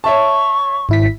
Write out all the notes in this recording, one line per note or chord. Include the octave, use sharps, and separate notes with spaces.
C#5 E5 A5 C#6
G#1 E4 B6